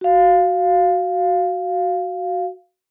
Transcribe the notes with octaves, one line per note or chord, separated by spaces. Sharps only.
F#4 F5